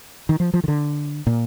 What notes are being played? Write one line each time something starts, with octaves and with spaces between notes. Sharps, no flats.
D#3
F3
F3
D#3
D3
A#2